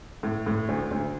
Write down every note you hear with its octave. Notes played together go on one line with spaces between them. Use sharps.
A2
A2
D2
D2